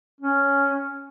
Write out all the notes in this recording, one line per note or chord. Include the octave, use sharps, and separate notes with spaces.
C#4